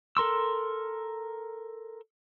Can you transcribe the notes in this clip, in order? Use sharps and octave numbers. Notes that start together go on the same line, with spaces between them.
A4 A#4 C6 E6